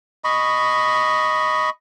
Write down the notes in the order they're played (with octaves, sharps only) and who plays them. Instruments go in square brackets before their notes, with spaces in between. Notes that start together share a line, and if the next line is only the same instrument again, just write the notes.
[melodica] D#5 B5 C#6